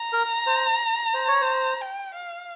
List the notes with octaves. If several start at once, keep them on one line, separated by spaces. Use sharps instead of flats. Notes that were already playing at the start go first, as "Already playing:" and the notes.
Already playing: A#5
A#4
C5
C5
C#5
C5
G5
F5